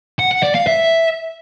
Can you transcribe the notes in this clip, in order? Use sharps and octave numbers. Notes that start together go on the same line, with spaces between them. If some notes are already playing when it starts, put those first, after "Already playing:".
F#5
F#5
D5
F5
E5